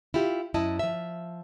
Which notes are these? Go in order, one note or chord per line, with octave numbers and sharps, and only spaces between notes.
E4 F4 G4
F#2 E4 D#5 A5
F3 E5